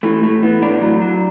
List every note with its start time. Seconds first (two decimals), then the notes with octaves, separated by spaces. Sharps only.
0.03 E3 A3
0.23 A2 A3
0.43 E3 B3
0.62 A2 D4
0.82 F#3
1.01 F#3